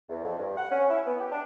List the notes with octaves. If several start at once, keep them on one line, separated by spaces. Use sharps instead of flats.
E2
F2
G2
F#5
C#4
E4
B3
G4
D4